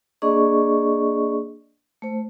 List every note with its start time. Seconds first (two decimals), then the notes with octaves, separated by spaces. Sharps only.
0.22 A#3 D4 G#4 D5 D#5 C#6
2.02 A3 C5